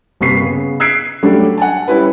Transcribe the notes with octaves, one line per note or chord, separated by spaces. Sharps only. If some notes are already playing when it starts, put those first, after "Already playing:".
G1 C3 A#3 C#6 B6 C7
C#3 B3
E6 F#6 G#6 B6 C7 D7
F#3 G3 A3 D4
F#5 G#5 A5
G3 C#4 E4 B4